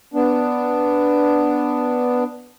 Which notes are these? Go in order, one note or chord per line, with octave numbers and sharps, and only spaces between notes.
B3 D4